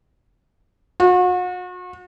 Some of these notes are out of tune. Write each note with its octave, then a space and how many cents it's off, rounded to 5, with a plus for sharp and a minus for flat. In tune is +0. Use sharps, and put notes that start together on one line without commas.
F#4 -40